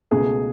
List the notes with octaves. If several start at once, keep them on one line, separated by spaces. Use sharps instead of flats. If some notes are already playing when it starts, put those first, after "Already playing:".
C#2 B2 A3 G#4